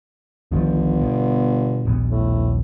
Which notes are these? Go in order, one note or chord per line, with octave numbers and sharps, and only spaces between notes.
G1 C2 D#3 F3
B2
D#1 A#1 B3
A2